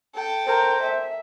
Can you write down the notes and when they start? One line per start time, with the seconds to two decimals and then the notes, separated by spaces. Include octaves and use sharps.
0.15 A4 G5
0.47 A#4 C5
0.82 E5